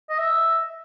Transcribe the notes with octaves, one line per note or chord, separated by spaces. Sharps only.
D#5
E5